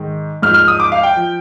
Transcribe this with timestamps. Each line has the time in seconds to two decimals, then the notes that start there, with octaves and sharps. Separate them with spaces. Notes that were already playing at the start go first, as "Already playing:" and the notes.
Already playing: G#2 D#3
0.42 G#2 F6
0.46 F3
0.54 F6
0.68 D#6
0.80 D6
0.92 F5
1.03 G5
1.16 F3